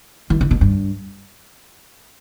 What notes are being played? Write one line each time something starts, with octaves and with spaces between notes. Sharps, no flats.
E3
C3
B2
G2